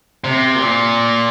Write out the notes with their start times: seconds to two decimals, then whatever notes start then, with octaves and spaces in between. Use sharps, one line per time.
0.24 C3
0.55 A#2